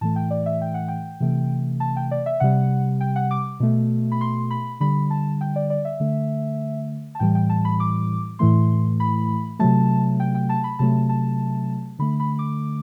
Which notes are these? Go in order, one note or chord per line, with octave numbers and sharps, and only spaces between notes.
A2 E3 A3 A5
G5
D5
E5
G5
F#5
G5
C3 E3 A3
A5
G5
D5
E5
C3 G3 F#5
G5
F#5
D6
B2 A3
B5
C6
B5
D3 G3 B5
A5
G5
D5
D5
E5
D3 A3
A5
A2 E3 G3 G5
G5
A5
B5
D6
A2 E3 A3 C6
B5
C3 F#3 A3 A5
G5
G5
A5
B5
C3 F#3 A3 A5
A5
D3 A3 B5
B5
D6